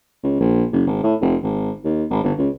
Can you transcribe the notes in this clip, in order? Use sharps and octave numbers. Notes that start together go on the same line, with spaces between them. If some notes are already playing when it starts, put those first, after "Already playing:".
C#2
A#1
F#1
G#1
A2
F1
G#1
D#2
G#1
G1
C#2